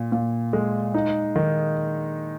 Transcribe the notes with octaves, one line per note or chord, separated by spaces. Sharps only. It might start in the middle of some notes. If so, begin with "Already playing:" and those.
Already playing: A#2
A#2
G#3
D#4
D#3